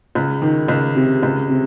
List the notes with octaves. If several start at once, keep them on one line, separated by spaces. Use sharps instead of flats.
C#2
D#3
C#2
C3
C#2
C3